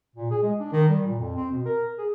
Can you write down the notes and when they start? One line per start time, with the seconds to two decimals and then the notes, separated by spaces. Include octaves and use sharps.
0.16 A#2
0.31 G#4
0.42 G#3
0.60 D4
0.72 D#3
0.89 G3
1.06 A#2
1.19 F2
1.36 C4
1.52 B2
1.66 A#4
1.98 G#4